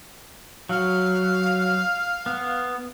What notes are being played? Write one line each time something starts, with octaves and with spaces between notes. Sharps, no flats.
F#3 F5
B3